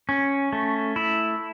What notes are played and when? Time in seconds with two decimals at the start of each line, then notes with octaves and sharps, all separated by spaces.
0.09 C#4
0.53 A3
0.96 E4